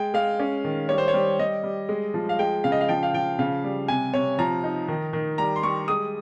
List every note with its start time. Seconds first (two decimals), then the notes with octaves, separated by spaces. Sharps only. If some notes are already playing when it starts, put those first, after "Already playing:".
Already playing: G#3 G5
0.14 G#3 F5
0.39 C#4
0.64 D#3
0.89 G3 C#5
0.98 C5
1.08 C#5
1.14 G3
1.39 G3 D#5
1.64 G3
1.89 G#3
2.14 F3
2.29 F5
2.39 G#3 G5
2.64 C#3 F5
2.72 D#5
2.81 F5
2.88 F3 G5
3.03 F5
3.14 F3 G5
3.39 C#3 F5
3.64 G3
3.88 C3 G#5
4.14 C3 C#5
4.39 F3 A#5
4.64 D#4
4.88 D#3
5.13 D#3
5.38 G3 A#5
5.56 C6
5.63 G3 C#6
5.88 G#3 D#6